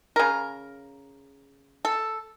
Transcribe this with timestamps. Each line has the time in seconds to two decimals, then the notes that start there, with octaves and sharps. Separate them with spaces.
0.16 C#3 A#4
1.85 A4